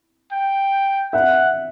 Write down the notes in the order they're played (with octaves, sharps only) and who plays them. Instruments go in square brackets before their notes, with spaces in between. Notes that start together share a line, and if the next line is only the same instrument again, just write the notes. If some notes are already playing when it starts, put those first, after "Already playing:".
[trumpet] G5
[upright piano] E5 [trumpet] F#5